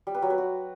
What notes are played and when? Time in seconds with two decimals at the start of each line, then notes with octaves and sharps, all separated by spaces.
0.07 G3
0.15 B4
0.22 F#3
0.30 B4
0.38 F#4